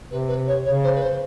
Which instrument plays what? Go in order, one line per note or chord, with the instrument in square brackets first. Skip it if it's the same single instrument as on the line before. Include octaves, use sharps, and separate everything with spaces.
[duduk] C3 [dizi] B4
[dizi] B4
C#5
[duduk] C#3 [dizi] C#5
[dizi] C5
B4
C5